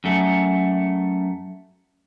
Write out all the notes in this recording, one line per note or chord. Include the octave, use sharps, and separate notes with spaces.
F#2 A3